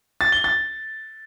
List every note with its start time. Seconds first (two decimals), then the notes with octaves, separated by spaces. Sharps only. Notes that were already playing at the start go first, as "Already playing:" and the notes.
0.21 A6
0.32 G7
0.44 A6